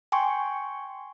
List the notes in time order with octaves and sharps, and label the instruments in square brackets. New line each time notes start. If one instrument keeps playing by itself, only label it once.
[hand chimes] G5 G#5 C6 C#6